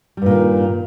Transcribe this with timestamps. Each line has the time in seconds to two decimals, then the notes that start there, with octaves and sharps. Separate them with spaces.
0.17 G3
0.22 G2
0.26 A#2
0.31 D#3